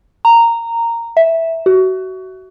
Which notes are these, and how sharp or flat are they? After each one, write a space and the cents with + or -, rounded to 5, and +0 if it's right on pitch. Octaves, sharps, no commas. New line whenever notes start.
A#5 -10
E5 -5
F#4 +25